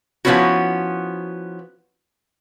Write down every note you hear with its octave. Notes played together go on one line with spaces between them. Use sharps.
F3 A#3 B3 C#4 E4 F#4